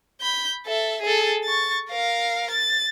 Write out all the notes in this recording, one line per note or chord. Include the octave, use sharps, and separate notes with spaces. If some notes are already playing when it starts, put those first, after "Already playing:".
B5 G6
A4 E5
G#4 A4
C#6 A6
A#4 F5
A6